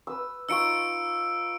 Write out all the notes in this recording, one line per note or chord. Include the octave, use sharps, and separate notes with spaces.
B4 E6
D#4 F4 C#6 E6 C#7 D7